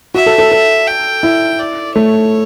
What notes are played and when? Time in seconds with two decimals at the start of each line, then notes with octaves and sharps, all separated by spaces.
0.14 F#4 E5
0.26 A4
0.38 A4
0.52 A4
0.87 G5
1.23 E4
1.59 D5
1.95 A3 C#5